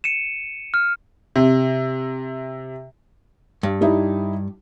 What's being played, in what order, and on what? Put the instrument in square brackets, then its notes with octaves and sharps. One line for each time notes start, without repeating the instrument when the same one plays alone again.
[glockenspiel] C#7 D#7 E7
F6
[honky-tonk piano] C3
[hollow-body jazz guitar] G2
[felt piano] G3 D#4 E4